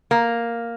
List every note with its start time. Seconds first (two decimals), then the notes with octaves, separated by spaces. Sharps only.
0.11 A#3